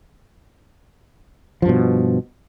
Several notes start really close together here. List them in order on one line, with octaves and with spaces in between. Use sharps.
F3 G2 B2